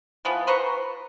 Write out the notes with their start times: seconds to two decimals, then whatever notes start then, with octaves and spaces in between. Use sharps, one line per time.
0.25 E3 F3 B3
0.47 B4 C5 A#5 C#6